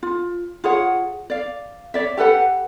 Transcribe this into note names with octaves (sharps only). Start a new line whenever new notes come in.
F4
F4 G#4 C#5 F#5
D5 F5
C#5 D5 E5
G4 A4 B4 F#5